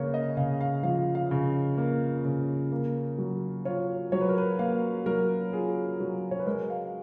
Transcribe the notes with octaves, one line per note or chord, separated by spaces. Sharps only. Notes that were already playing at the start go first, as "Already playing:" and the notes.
Already playing: C#3 A#3 B4 C#5
D#5
C#3 F5
F5
F3 F5
F5
C#3
A#3
C#3
A#3
F#3
F4 C#5
F#3 C#5
B4
A#4
B4
A#3 F5
F#3 A#4
F4 G#4
F#3
C#5
B4
G#3 A#4
F5